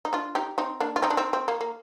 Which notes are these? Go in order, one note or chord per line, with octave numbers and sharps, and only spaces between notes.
D#4
D4 F4
D#4 G4
C4 D#4
A#3 D4
F4
C4 D#4
D4
C4 D#4
C4
A#3
A#3